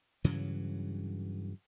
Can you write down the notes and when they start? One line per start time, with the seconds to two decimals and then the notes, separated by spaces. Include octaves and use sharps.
0.24 G2 C#3 E3 F#3